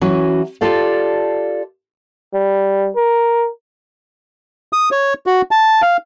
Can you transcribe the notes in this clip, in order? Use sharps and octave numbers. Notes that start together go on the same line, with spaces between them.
E3 F#3 C#4 F#4
F4 G4 A4 D5 F5
G3
A#4
D#6
C#5
F#4
A5
F5